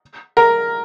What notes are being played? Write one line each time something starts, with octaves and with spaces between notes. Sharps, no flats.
A#4